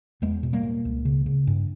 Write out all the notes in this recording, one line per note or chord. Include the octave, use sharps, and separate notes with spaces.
E2 G#3 B3
B2
G3 A#3
B2
C#2
C#3
C#3
G2